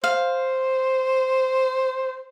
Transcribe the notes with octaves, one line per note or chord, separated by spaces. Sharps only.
C5 F5